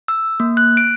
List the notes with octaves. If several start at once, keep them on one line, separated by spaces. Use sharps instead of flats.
E6
A#3
F#6
D7